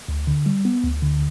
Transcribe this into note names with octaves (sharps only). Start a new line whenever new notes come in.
D2
D3
G3
B3
D2
D3